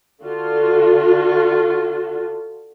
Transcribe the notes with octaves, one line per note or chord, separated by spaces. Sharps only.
D3 F4 F#4